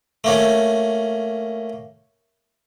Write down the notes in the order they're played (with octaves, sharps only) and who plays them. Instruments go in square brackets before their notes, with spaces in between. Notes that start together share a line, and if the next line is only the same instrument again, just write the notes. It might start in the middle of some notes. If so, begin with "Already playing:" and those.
[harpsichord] A3 A#3 C#4